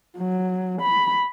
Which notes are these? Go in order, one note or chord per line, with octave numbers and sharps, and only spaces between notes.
F#3
B5